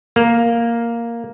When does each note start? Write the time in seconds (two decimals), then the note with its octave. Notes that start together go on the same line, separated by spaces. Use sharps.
0.16 A#3